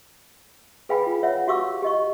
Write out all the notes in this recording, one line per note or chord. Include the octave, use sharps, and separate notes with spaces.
G#4 B4 F5 G5 G#5 B5
F4
C#5 E5 F#5
F#4 G4 F5 C#6 D6 E6
G4 D#5 C#6